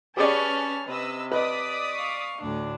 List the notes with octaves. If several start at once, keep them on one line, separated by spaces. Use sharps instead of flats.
C#4 G4 G#4 B4 D5 A5 F6
C3 B4 D#5 E6
B4 D5 D#5 D#6 B6
F5 C#6
D2 A2 D4